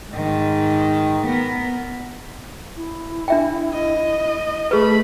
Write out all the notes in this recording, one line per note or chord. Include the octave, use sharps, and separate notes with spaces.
G#2 D#3
B3 A#4
E4
D4 E5 G5
D#5
A3 G#4 B4 B5